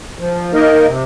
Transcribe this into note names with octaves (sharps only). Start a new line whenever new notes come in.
F3
A#3 D#4 A#4 D#5
C3